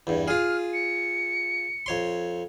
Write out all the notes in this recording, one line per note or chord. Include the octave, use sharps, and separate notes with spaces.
E2 G2
F4 G#4 F6
C#7
F2 C#5 C6